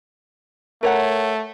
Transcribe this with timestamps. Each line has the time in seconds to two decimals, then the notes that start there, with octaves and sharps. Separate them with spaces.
0.83 A3 A#4 C#5 F#5